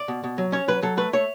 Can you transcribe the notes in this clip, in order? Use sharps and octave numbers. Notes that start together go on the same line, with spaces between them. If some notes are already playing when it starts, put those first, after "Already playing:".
Already playing: D5
B2
B2
F#3
C#4 C#5
F#3 B4
F#3 A4
A3 B4
A3 C#5